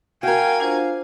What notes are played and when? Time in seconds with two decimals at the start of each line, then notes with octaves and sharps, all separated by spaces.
0.23 F#4 A#4 F5 G5 G#5 G#6
0.60 D4 F4 C5 F5